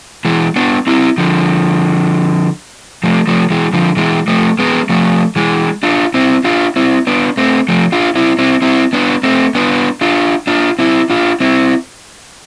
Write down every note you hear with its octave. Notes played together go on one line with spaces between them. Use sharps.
E3 G#3
B3 D4
C4 E4
D3 F3
F3 A3
F3 A3
E3 G#3
D3 F3
E3 G#3
F3 A3
G#3 B3
F3 A3
E3 G#3
D4 F4
C4 E4
D4 F4
C4 E4
B3 D4
A3 C4
F3 A3
D4 F4
C4 E4
C4 E4
C4 E4
B3 D4
A3 C4
B3 D4
D4 F4
D4 F4
C4 E4
D4 F4
C4 E4